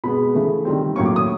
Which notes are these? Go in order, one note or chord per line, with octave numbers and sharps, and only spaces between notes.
B2 G#3 B3 B5
C#3 E3 A3
D#3 G3 C4
A2 F#3 A#3 C#4 C#6
D6
D#6